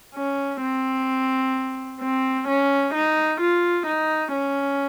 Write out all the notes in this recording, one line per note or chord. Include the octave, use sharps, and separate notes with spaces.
C#4
C4
C4
C#4
D#4
F4
D#4
C#4